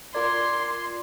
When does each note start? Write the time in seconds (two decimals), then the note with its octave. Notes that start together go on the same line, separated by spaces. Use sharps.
0.15 F4 A#4 D5 C6 D6 G#6